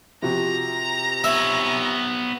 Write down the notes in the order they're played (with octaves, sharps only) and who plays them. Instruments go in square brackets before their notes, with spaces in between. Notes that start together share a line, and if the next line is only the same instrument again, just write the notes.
[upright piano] C3 F3 F#4 [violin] A#5
[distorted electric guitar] B3 C#5 [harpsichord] E5